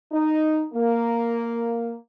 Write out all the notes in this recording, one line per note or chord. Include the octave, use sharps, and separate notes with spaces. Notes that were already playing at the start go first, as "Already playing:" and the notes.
D#4
A#3